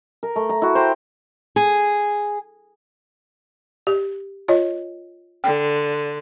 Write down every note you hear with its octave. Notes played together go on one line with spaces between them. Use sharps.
A#4
A3
A#5
E4 F#4
C5 G5 A#5
G#4
G4
F4 C#5 D#5
D3 G5